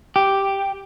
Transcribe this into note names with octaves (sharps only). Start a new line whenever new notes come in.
G4